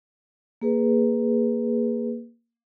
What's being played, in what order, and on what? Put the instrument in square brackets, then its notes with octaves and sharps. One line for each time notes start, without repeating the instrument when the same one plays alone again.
[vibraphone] A#3 G#4 B4